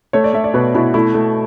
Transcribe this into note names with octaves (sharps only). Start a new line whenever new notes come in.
A3 C#5
D5
A3 E5
D5
B2 B4
B2 E4
A3 E4
A3